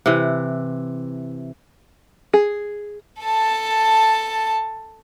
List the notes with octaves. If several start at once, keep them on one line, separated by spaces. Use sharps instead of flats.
C3 E3
G#4
A4 A5